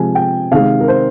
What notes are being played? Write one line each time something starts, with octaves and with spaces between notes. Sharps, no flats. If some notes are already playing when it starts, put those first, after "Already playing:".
Already playing: C3 F3 G#3 G#5
G5
C3 D#3 G#3 F5
A#4
C5